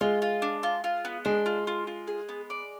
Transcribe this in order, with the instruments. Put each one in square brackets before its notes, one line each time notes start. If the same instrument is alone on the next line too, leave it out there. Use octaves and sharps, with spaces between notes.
[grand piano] G#3 [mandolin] F4
[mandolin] F4
D4
F4
F4
B3
[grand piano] G#3 [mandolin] D4
[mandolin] F4
F4
F4
G#4
B3
D5